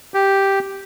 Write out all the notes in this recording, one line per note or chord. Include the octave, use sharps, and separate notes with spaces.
G4